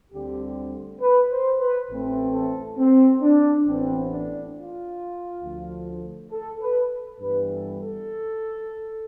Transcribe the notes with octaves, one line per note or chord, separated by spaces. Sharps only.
D2 D3 G3 C4 G4
B4
C5
B4
A1 A2 E3 A3 C4
A4
C4
D4
A1 A2 E3 B3 C4
D4
F4
D2 D3 F3
A4
B4
G2 E3 G3 B3 B4
A4
A4